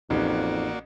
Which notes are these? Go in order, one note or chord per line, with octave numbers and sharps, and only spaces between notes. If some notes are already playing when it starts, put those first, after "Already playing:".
A1 F2 A#3 D#4 F#4 D5